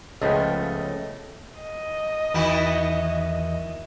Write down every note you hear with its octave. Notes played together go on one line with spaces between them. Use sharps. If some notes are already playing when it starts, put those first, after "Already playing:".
C#2 C#3 F3 A3 B3 D#5 G5
D#5
E2 D#3 E4 F#4